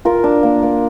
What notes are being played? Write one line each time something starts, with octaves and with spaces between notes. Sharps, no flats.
F4 A#4
D4
A#3
A#3